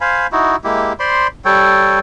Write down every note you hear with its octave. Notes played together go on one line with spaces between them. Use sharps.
C5 F5 G#5 B5
D#4 E4 F#4
G#3 A#3 E4 G4
C5 D5 B5 C6
G3 A4 C#5 G5